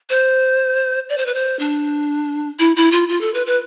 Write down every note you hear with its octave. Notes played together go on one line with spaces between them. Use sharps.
C5
D5
C5
B4
C5
D4
E4
E4
F4
F4
A4
B4
B4